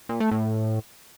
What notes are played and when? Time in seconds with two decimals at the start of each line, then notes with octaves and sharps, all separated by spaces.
0.09 A#2
0.20 A3
0.31 A2